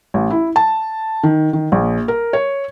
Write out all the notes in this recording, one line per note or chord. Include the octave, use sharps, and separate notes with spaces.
A1
E4
A5
D#3
D#3
A#1
A#4
C#5